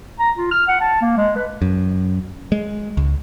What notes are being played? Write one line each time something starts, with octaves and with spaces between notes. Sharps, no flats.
A#5
F4
F6
F#5
A5
A#3
G#3
B4
F#2
G#3
C#2